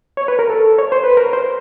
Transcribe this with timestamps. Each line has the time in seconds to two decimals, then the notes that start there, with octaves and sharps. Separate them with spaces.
0.17 C#5
0.28 B4
0.39 A#4
0.50 A4
0.79 C#5
0.92 C5
1.04 B4
1.17 A#4
1.33 C5